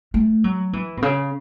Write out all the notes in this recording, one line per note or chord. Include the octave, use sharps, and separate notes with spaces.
A3
F#3
E3
B2
C#3